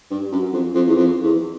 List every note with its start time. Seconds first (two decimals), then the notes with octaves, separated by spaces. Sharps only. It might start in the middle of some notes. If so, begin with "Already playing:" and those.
0.11 G2
0.32 F#2
0.53 F2
0.74 F2
0.87 E2
0.95 F2
1.24 E2